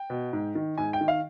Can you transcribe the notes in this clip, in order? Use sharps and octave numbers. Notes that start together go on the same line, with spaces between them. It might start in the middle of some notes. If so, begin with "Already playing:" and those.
Already playing: G5
B2
G#2
D#3
G#2 G#5
G5
D#3
F5